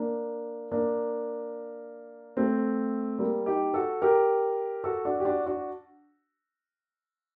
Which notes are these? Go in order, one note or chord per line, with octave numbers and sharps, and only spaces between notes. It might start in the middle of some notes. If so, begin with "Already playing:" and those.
Already playing: A#3 D4
A#3 D4
A3 C4
G3 A#3
D#4 G4
F#4 A4
G4 A#4
F#4 A4
D4 F#4
G4
D4 F#4
D4 F#4